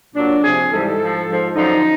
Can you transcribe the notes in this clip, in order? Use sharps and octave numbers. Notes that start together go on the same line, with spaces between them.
A#2 F#3 D4
C3 F3 G#4
G#2 E3 G3 A4
G#2 F3
G#2 F3
F#2 D3 F3 D#4